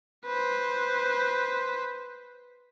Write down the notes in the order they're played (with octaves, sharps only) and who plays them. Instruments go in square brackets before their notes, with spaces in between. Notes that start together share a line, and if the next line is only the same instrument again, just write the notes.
[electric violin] B4 C5